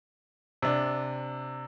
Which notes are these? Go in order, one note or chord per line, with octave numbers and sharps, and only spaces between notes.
C3 D4